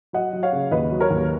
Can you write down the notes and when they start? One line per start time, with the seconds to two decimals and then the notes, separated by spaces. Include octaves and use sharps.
0.13 F#3 D#5 F#5
0.33 F#3
0.43 C#5 F5
0.52 C#3
0.71 D#2 B4 D#5
0.91 F#3
1.00 A#4 C#5
1.10 D#2